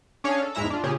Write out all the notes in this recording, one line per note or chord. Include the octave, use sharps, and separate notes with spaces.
C#4 D4 G#4 C#5 F5
A4
E2 G#2 G#3 E4 E5 A#5
D4 F4
A#2 C#3 G4 G#4